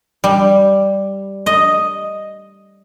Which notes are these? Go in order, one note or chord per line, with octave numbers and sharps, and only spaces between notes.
G3
D#5